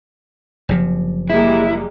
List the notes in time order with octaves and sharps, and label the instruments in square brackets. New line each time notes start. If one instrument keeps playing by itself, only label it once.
[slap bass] F#1 C3 F3
[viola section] G3 G#3 A#3 [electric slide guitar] E4